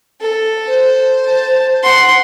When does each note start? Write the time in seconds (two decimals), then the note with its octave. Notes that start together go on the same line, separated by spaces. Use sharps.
0.21 A4
0.67 C5
1.27 A5
1.83 F#5 C6